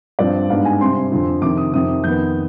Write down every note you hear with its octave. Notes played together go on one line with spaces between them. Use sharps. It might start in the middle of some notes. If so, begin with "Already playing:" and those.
G2 F3 C4 D5
G#2 G3 B3 D4 F5
G#5
C3 G3 C4 C6
F2 D3 F3 C4
F2 C3 D#3 D6
D#6
F2 C3 D#3 D#6
F2 D#3 B3 G6